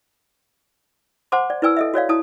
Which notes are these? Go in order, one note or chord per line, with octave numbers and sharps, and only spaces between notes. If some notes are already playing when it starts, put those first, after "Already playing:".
C5 F#5 A5 C6 D6
D5
E4 B4 D5 G#5 E6
A4 D#5 E5
F#4 C#5 D5 F5
E4 A5 D#6